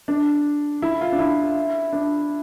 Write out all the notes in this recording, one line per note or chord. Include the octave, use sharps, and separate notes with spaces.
D4
E4
F4
D4
E4
D4